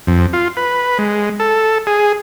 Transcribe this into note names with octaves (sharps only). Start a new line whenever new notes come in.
F2
F4
B4
G#3
A4
G#4